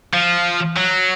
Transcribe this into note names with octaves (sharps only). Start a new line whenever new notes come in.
F3
F#3